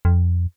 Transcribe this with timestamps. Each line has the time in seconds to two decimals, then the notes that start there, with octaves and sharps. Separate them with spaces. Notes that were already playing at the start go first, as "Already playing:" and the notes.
0.05 F2